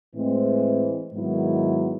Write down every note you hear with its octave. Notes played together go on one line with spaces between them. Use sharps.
A2 E3 G#3 C4
G#2 D#3 F#3 B3 E4